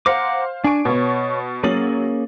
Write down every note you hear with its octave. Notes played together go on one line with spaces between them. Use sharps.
C5 F5 F#5 A#5 D6
D4 G#5 C#6 D7
B2 B3 C#5
F#3 A#3 C#4 G#4 A6 F#7